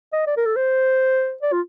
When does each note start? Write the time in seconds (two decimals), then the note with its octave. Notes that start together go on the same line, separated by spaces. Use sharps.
0.13 D#5
0.27 D5
0.37 A#4
0.46 A4
0.56 C5
1.42 D5
1.52 F4